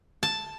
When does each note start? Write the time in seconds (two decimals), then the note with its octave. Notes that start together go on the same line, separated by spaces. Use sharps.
0.23 A5